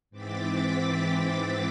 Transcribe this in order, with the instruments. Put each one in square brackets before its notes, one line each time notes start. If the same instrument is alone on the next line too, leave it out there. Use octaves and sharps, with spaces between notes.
[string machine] G#2 E3 C4 D6 A6 B6